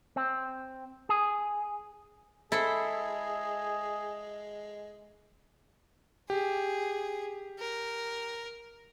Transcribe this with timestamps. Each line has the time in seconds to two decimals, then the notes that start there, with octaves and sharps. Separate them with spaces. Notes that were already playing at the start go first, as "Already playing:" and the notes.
0.16 C4
1.09 G#4
2.52 G#3 E4 G#4 A4 C5 B5
6.30 G4 G#4
7.60 A#4